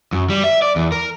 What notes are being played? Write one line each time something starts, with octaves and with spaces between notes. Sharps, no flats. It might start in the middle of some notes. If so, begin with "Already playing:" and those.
F#2
G3
E5
D5
E2
A#4